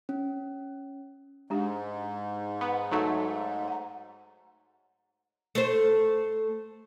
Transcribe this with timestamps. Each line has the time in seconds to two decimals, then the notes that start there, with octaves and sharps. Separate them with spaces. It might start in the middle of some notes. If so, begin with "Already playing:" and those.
0.09 C#4
1.50 G#2 G#3 D4 G4
2.61 B3
2.92 F#3 A3 D#4
3.68 F#5 A#5
5.55 A3 C5